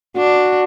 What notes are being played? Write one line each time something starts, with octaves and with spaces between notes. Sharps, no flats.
D4 F#4